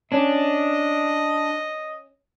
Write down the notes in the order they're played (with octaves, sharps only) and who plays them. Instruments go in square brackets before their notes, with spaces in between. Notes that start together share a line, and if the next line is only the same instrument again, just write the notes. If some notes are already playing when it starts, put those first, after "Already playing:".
[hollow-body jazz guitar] C#4 [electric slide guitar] D4 [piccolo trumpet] D#5